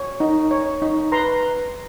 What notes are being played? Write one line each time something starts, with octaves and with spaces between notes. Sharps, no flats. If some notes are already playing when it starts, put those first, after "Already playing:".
Already playing: C#5
D#4
C#5
D#4
B4 A#5 C6